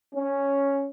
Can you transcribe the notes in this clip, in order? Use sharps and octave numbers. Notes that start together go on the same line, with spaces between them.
C#4